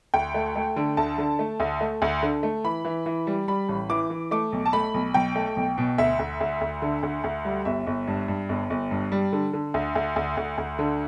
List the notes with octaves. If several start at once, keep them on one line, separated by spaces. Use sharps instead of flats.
D2 G5
A3
A3
D3
D2 A5
D3
A3
D2
A3
D2
D3
A3
E3 B5
E3
E3
G3
G3 B5
A1
E3 D6
E3
A3 D6
B1
A5
A3 B5
B1
B1 G5
A3
B1
B2
D2 E5
D2
D2
D2
D3
D2
D2
G3
G1 E5
G1
G2
G2
G1
G1
G2
G3
D3
D3
D2
D2
D2
D2
D2
D3